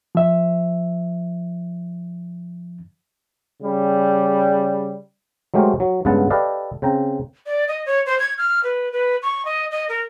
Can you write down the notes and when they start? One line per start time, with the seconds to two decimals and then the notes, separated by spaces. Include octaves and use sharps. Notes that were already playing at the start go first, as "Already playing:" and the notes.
0.15 F3 E5
3.62 C#3 G3
5.54 F#3 G#3 A3 G4 A#4 C5
5.80 F#3
6.05 G2 C#3 G#3 B3 F#5 A5
6.30 G4 A4 B4 D5 D#5 F5
6.82 C#3 C4 G5 A#5
7.46 D5
7.68 D#5
7.86 C#5
8.06 C5
8.20 G#6
8.38 F6
8.64 B4
8.92 B4
9.23 C#6
9.45 D#5
9.71 D#5
9.89 A#4